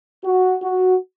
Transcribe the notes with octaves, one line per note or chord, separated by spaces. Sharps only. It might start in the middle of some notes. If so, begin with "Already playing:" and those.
F#4
F#4